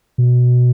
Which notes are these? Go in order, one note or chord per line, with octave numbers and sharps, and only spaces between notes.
B2